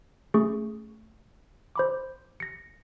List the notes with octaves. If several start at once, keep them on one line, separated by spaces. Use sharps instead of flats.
A3 C#4 G#4 C#6
C5 B5 D6
A#6 C#7